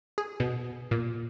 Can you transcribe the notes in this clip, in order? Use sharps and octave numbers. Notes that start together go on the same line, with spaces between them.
G#4
B2
A#2